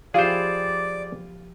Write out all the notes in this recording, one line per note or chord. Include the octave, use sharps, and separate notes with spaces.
F3 E4 F4 G4 G#4 C5 D5